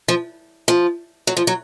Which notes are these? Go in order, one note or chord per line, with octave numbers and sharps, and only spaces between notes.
F3
F3
F#3
F3
F#3